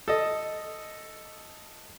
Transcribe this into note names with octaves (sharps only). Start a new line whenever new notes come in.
A4 D#5